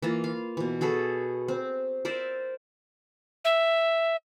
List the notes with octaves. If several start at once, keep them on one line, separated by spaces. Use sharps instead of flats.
E3 A#3 F4
F5
B2 E3
F#4 G#4 A4 B4
C4
A#4 C5 D5 E5
E5